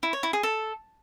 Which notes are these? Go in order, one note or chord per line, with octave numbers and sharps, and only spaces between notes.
E4
C#5
E4
G#4
A4